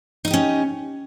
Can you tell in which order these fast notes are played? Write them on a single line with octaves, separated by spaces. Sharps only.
D#4 D#5 G4 C#4